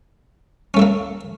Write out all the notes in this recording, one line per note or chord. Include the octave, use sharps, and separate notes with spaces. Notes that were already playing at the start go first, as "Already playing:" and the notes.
A3 A#3 C#4 E4